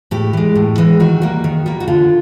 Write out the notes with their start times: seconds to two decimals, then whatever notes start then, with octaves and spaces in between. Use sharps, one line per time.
0.11 A2 G4
0.33 E3 G#3
0.55 A2
0.78 E3 G#3
1.00 D#3 F#4
1.22 G3 A#3
1.44 D#3
1.66 G3 A#3
1.80 F#4
1.87 D3 F4